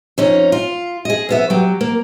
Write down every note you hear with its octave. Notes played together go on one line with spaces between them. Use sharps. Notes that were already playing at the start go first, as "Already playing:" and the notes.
F2 C#4 D#4
F4
G#4 D#5
F2 B3 E5
F#3 G4
A#3